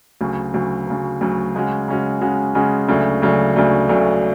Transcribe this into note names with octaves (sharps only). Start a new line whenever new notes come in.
D2 C#3 F#3
D2 C#3 F#3
D2 C#3 F#3
D2 C#3 F#3
C#3 G#3 C#4 F#4
C#3 G#3 C#4 F#4
C#3 G#3 C#4 F#4
C#3 G#3 C#4 F#4
D2 C#3 F#3 A3 D4
D2 C#3 F#3 A3 D4
D2 C#3 F#3 A3 D4
D2 C#3 F#3 A3 D4